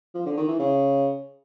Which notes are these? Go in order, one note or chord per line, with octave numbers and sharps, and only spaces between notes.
F3
D3
D#3
E3
C#3